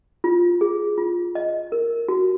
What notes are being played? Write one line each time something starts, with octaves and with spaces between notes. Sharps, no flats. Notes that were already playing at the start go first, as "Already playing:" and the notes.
F4
G#4
F4
D#5
A#4
F#4